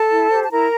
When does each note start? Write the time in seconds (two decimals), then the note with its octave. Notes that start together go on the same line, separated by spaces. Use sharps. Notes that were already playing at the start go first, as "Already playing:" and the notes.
Already playing: A4 A5
0.11 E4
0.30 G4 C5
0.43 A5
0.50 E4 A#4 A#5